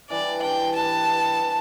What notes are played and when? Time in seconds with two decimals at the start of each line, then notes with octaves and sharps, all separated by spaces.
0.10 E3 G3 D4 D5
0.42 E3 G3 D4 G5
0.76 G3 E4 G4 B4 A5
1.08 G3 E4 G4 B4
1.40 E3 G3 D4